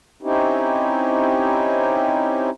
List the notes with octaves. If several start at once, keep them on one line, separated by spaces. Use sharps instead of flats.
C4 C#4 D#4 E4 G4